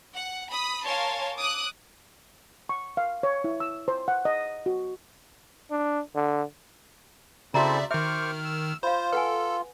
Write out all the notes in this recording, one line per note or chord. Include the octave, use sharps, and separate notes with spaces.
F#5
B5 D#6
A#4 C#5 F5 G#5 A5 C6
D6 D#6 F#6
C#6
F5
C#5
E4
E6
C5
F#5
D#5
F#4
D4
D3
C#3 C4 E4 F#4 A4 D5 E5 A#5
D#3 C5 E5 C#6 D6 F6
E6
F4 C5 F5 B5
A4 B4 F#5 G#5